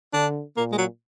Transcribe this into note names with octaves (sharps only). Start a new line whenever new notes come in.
D3 D4
A#2 A#3
G#3
F#3